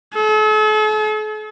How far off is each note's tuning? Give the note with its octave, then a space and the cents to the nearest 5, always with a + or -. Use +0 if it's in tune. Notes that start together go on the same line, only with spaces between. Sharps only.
A4 -45